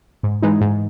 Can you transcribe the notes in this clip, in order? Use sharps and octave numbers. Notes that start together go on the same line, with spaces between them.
G#2
E3 G#3 D#4
G#2